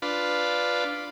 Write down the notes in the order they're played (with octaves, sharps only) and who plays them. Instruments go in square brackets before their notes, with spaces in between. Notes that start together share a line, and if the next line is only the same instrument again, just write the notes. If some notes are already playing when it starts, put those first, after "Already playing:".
[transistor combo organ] D4 F4 B4